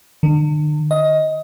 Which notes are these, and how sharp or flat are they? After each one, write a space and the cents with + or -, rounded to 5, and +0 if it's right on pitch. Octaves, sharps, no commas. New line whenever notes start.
D3 +45
D#5 +15